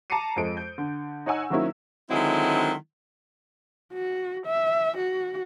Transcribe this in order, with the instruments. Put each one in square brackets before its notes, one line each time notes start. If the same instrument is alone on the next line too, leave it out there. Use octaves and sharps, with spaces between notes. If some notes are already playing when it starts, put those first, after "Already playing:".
[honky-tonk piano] A5 A#5 D6 C7 C#7 D#7
F2 F3 G#3 A4 D7
G6
D3
D#4 C#5 F#5 G#5 E6
D#3 F#3 A#3 C4 C#4 E4
[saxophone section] D3 D#3 F#3 G#3 C4 E4
[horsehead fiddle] F#4
E5
F#4